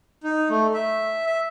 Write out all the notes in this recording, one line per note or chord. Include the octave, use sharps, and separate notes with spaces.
D#4
A3
E5
E5